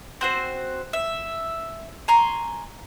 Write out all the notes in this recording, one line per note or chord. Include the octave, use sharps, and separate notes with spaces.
C4 F#4 C5
E5
G#5 A#5 C6 C#6